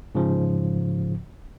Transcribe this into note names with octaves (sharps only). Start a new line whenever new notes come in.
G#2 C#3 F3